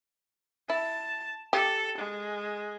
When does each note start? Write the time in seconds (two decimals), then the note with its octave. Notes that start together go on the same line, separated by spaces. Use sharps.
0.70 E4 A5
1.53 G4 A4
1.98 G#3